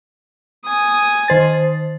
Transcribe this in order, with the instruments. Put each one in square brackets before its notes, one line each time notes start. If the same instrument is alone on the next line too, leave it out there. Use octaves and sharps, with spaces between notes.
[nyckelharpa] G#5 D#6
[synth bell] D#3 C5 A6